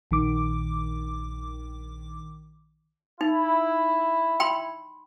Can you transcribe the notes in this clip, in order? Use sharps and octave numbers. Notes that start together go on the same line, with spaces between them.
A#1 D#3 D6
D#4 E4
G5 B5 C6